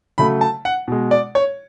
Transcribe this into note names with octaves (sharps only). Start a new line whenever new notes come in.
C#3 F#3 A3 B5
A5
F#5
B2 G#3
D5
C#5